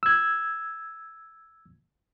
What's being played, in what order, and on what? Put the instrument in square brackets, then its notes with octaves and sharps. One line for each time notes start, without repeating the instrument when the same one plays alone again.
[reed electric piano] E6 G#6